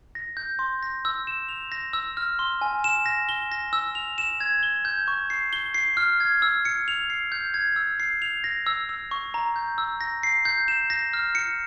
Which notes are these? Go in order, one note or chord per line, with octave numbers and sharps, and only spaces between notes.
A#6
G6
C6
A#6
E6
E7
F7
A#6
E6
F6
C6
G#5
E7
A#6
G7
A#6
E6
F7
E7
G#6
G7
G6
C#6
C7
G7
C7
F6
G#6
E6
C#7
F7
C7
G6
G#6
E6
C7
F7
A#6
E6
E6
C#6
A#5
G6
E6
A#6
C7
G6
E7
A#6
F6
C#7